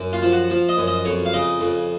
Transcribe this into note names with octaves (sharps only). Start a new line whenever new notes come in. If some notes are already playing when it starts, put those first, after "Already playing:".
Already playing: F#2
F4
F3
F#4
F3
D#5
F#2
D#5
F2 C#5
F5
C#3 D#5
F2